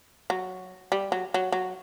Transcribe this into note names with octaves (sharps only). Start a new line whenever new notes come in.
F#3
G3
F#3
F#3
F#3